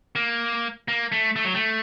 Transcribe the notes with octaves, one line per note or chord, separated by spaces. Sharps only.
A#3
A#3
A3
A3
F#3
A3